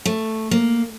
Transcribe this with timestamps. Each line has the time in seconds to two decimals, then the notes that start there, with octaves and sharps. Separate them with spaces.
0.06 A3
0.51 A#3